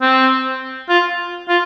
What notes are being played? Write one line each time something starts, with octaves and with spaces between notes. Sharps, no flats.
C4
F4
F4